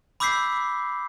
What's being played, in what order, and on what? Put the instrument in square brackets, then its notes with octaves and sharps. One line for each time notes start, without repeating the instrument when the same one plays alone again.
[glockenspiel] B5 D6 E6 G6 B6 C7